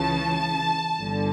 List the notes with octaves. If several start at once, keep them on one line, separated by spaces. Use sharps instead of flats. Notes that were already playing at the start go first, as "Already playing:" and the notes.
Already playing: C#2 C#3 E3 A5
G1 G2 D3